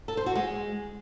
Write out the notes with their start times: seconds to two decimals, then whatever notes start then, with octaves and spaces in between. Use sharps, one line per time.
0.08 A4
0.17 C5
0.26 F#4
0.35 G#3